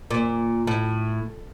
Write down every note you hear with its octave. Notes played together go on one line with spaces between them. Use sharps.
A#2
A2